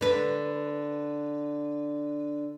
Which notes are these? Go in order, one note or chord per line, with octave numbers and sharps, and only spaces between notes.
D3 B4